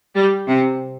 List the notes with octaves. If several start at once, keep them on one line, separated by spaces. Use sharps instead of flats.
G3
C3